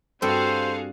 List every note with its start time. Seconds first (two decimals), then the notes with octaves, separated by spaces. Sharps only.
0.22 G2 C4 F#4 G#4 A4 C5 F5